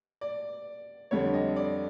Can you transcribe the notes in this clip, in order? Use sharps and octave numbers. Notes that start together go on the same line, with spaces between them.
D5
F2 D3 G3 C#5
D#5
D5